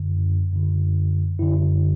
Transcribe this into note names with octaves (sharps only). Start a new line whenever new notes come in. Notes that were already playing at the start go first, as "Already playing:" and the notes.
Already playing: F#2 D3
F#2 D3
F#2 D3 E4